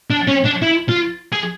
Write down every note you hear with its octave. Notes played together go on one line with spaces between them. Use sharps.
D4
C#4
D4
E4
F4
G#4